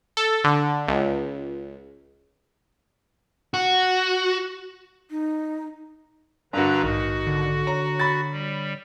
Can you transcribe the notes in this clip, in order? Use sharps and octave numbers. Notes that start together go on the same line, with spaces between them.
A4
D3
C#2
F#4
D#4
G2 D3 D4 F#4 A#4 B4 D5 A#5
A#1 G#2 D#3 F#4
D3
C#5 A#5 A#6
B5 A6
G3